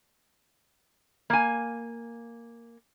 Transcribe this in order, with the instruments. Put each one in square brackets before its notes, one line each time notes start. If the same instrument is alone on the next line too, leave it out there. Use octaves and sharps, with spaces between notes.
[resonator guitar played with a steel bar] A#3 G#5